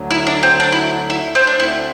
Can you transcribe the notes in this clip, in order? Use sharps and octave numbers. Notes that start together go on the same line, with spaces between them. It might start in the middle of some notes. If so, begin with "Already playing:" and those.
Already playing: D2 D3 F#3
E4
D4
C4
D4
E4
E4
C4
D4
D2 D3 A3 C4 E4